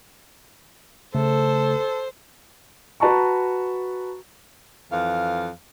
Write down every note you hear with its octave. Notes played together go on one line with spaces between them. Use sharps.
C#3 A3 A4 C5
F#4 B4 A5 A#5 C#6
F2 E3 F5